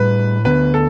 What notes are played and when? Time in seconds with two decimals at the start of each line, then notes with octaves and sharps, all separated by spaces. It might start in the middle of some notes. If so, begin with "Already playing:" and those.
Already playing: A2 G3 D4 B4
0.45 D2 D3 B3 B4
0.74 A4